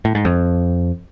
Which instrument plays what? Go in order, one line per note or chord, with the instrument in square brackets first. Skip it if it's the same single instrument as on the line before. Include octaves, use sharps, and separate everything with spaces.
[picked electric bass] A2
G#2
F2